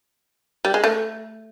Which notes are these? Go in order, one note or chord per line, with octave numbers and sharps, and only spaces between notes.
G3
G#3
A3